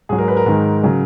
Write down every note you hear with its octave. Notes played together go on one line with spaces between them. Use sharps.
G#2 F#3 G#4
A#4
B4
A#4
G#2 D#3 G#3
C#3 F#3